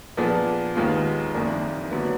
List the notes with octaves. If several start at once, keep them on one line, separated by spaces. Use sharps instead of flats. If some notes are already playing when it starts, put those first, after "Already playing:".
A#2 F3 B3 D4 G#4
D#2 D#3 G#3 B3 F4
F#1 F2 D#3 A#3 D4
D3 F#3 B3